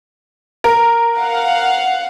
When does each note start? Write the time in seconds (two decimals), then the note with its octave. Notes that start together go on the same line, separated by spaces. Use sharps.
0.64 A#4
1.18 F5 F#5